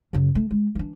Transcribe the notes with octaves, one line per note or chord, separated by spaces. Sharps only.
F#2 C#3
A3
G#3
E3 D4